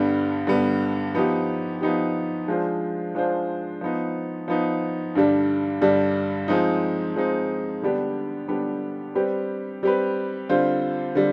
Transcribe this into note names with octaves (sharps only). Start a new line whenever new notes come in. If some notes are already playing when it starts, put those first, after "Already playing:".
Already playing: G2 D3 G3 B3
G2 D3 G3 B3
F3 B3 D#4 G4
F3 B3 D#4 G4
F3 G#3 D4 F4 C5
F3 G#3 D4 F4 C5
F3 B3 D#4
F3 B3 D#4
G2 D3 G3 D4
G2 D3 G3 D4
F3 G#3 C4 D#4
F3 G#3 C4 D#4
D3 G3 B3 D4 G4
D3 G3 B3 D4 G4
G3 C4 G4 B4
G3 C4 G4 B4
D3 G3 C4 F4 C5
D3 G3